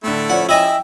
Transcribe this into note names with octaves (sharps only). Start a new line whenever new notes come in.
A2 D3 A3 E4
F3 C#4 D5 F#5
E4 D#5 E5 G5 G#5 E6